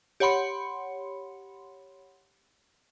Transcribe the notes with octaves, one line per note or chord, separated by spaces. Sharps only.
G4 C#5 F#5 B5 C6 C#7